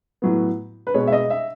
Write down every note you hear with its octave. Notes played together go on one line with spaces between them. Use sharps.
A2 F#3 B3
B4
B2 G#3 B3 C#5
E5
D#5
E5